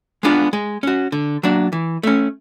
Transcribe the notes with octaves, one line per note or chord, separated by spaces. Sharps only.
G#3 B3 D4 F4
G#3
C#4 F#4
D3
F#3 A#3 D4
E3
A3 C#4